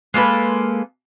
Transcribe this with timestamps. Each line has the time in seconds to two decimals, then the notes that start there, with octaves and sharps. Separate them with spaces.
0.14 G#3 A#3 A4 B4